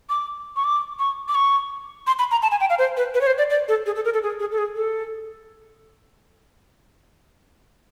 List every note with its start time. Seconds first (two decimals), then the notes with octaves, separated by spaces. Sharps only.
0.10 D6
0.56 C#6
0.64 D6
0.99 C#6
1.28 D6
1.35 C#6
2.07 C6
2.19 B5
2.31 A#5
2.42 A5
2.51 G#5
2.60 G5
2.70 F5
2.79 C5
2.97 B4
3.14 B4
3.21 C#5
3.27 C5
3.38 D5
3.50 D5
3.68 A4
3.86 G#4
3.96 A4
4.05 A#4
4.14 A4
4.23 G#4
4.40 G#4
4.52 A4
4.58 G#4
4.76 A4